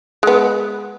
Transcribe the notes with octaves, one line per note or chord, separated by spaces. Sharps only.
G#3 B3